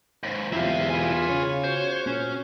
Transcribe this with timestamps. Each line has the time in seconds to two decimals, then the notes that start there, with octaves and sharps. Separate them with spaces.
0.23 D#2 G#2
0.53 E2 E4 F4 G4 C5 E5
0.90 F4 B4 G#5
1.29 C#3 C#5
1.64 F#4 C5
2.07 A#2 C#4